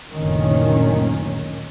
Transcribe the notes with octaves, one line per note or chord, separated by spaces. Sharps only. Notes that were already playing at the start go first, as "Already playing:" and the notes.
F#1 D2 A#2 D#3 C#4